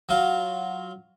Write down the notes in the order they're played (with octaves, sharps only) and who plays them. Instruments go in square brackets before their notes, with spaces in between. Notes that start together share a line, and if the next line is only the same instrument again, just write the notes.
[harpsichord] F#3 F4